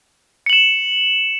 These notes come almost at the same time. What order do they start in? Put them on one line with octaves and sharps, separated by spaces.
C#7 F#7 E7